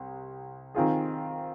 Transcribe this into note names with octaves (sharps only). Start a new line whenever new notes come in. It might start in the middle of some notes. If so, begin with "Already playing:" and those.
Already playing: C2
D#3 C4 F4 G#4